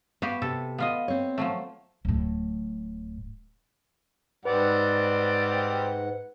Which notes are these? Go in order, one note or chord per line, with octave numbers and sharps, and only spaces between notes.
B3 F#4 G4 F5
C3 A4
B3 F4 D#5
C4 C#5
F3 F#3 A3
D1 A2
G#2 G3 C4 B4 D5 F#5